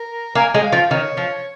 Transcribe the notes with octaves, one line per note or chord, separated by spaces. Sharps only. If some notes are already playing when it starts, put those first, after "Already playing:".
Already playing: A#4
A#3 G#5
G#3 G#5
F5
F3
F5
D#3 C#5
F3